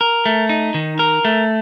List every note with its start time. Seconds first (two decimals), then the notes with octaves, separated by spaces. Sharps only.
0.01 A#4
0.26 A3
0.49 D#4
0.74 D#3
0.99 A#4
1.25 A3